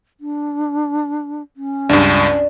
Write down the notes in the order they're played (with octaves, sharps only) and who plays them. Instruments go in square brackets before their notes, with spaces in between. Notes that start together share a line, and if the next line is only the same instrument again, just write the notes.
[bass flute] D4
C#4
[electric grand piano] C#2 G2 [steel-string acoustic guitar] D4